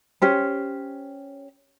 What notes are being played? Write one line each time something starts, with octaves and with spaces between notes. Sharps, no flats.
C#4 G4 C5